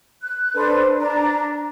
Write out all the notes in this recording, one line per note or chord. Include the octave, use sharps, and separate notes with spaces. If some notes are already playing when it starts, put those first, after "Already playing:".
F#6
D4 A4 B4 C5
D4 A#5